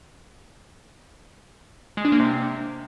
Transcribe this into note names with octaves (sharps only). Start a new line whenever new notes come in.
G#3
D4
A#3
C3